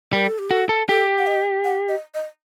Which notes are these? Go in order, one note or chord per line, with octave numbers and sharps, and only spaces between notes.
G3 A#4
A4
G4
F#4 A4
A4
G4 A4
F#5
D#5
F#5
D#5
D#5